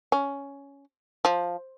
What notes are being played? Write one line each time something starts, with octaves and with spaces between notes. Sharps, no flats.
C#4
F3